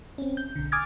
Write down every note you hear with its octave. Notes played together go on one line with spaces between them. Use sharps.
C4 C#4
G6
B1 D3
G#5 D6 D#6 F6 G#6 A6